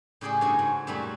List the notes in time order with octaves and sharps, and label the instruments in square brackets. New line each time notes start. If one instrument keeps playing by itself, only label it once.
[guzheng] A2 C#3 G4 G#4 D5 D#5
G2 C#3 F#4 A4 C#5 G#5
G#2
F#2 A#2 F#3 G3 A3 B5